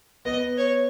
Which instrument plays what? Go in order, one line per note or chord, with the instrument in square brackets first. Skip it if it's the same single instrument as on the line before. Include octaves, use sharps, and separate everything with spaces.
[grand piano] B3 [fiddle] D#5
[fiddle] C#5